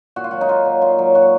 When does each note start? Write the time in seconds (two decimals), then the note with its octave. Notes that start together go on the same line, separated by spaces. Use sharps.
0.16 A#2 F#4
0.24 F4
0.31 F#3 F#4
0.41 D#4
0.49 A#2 F4
0.65 F#3
0.82 A#2 F4
0.98 F#3
1.15 A#2 F#4